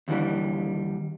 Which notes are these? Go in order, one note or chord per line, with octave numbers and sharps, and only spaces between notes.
D#2 D3 E3 G3